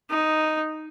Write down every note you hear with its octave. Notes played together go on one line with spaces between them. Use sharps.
D#4